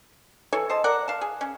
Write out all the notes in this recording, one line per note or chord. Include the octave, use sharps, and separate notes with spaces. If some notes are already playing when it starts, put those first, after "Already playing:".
E3 A4 C#5
C5 D#5 A5
A#4 D5 F#5
F5 A5
G#4
C#4